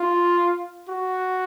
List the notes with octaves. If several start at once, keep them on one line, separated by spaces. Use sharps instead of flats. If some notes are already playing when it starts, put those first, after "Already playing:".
Already playing: F4
F#4